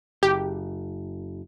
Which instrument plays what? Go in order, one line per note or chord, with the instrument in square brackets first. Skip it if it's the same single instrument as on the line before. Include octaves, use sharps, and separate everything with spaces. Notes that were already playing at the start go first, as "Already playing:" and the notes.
[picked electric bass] F#1 [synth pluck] G4